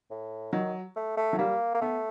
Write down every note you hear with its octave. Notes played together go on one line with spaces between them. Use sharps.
A2
D#3 F#3
A3
A3
F#3
G3 A#3
A#3
A3 B3